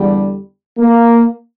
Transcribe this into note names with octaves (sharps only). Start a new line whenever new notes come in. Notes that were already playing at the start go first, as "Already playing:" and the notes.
Already playing: E2 D3 G3
A#3